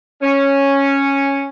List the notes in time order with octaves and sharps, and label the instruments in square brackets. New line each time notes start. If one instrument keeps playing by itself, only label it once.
[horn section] C#4